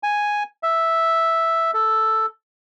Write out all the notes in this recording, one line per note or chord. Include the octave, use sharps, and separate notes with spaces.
G#5
E5
A4